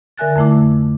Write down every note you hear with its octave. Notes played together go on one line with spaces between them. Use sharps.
D3 A#4 E5 G#5 F#6 A6
F2 D3 A3 E4 D6